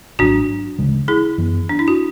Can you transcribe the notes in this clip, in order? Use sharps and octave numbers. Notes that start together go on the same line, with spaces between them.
G#1 G#2 F#3 D4 F#4
D2 C#3 E3 G#3
E4 G#4
F#2 E3 B3
D4
E4
F#4